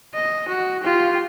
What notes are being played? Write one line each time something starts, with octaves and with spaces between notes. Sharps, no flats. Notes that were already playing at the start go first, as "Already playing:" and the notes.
D#5
F#4
F4 G4